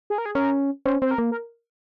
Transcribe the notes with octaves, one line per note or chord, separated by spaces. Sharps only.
G#4
A#4
G#4
C#4 A#4
C#4 C5
C4 C5
A#4
A#3
A#4